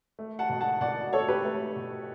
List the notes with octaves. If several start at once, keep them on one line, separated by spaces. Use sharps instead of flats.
A3
F#5 A5
B2
F#5 A5
B2 D5 F#5
A3 A4 C#5
G4 B4
A3
B2